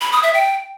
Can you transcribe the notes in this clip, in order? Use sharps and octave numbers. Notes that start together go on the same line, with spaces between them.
B5
D#6
E5
G5